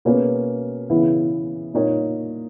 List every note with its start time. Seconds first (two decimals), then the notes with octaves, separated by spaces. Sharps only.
0.05 B2 A#3 C#4 G#4 B4
0.90 C#3 E3 B3 E4
1.74 A#2 A#3 D#4 A#4 C#5